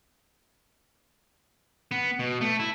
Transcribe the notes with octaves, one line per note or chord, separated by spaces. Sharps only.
B3
B2
A3
E4